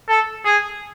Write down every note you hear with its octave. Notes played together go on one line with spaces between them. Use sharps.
A4
G#4